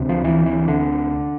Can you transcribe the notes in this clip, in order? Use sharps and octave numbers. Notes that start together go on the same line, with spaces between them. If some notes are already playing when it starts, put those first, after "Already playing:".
Already playing: D2 C3
F3
E3
E3
D3